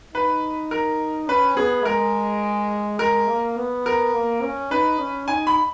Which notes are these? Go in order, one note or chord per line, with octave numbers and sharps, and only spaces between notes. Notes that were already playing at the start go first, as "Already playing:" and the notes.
D#4 B4
A#4
C#4 B4
B3 G#4
G#3 A#4
G#3 A#4
A#3
B3
A#4
A#3
C#4
D#4 B4
C#4
D#4 G#5
B5